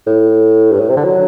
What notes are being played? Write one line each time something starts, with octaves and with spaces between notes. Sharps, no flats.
A2
G2
A2
C3
D3
F#3